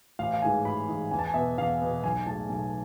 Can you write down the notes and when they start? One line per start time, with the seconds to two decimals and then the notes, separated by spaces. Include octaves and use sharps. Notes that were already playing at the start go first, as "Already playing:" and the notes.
0.19 A1 F5
0.34 F5
0.42 G#2 E3 G#3 G#5
0.65 A1 B5
0.88 G#2 E3 G#3
1.11 E2 G#5
1.19 A5
1.26 G#5
1.34 B2 B3 E5
1.58 E2 F5
1.81 B2 B3
2.03 B1 G#5
2.26 A2 G#3 A5
2.50 B1